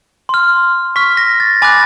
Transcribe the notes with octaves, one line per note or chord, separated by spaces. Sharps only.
C6 F6
C#6 F6 B6
A#6
A6
G#5 B5 D6 F#6 A6